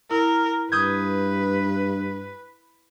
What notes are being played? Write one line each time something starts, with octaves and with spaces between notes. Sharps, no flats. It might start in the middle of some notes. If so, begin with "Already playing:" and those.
E4 A#4
G2 B4 D#6 G6 G#6